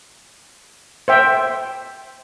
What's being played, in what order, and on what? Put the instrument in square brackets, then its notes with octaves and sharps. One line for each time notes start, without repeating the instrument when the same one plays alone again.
[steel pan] C5 E5 G5